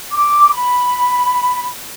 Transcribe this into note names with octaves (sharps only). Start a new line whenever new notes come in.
D6
B5